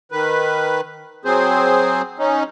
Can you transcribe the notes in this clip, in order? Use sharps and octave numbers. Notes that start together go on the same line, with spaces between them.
D#3 B4
F#3 C4 G#4 C5
C#4 D#4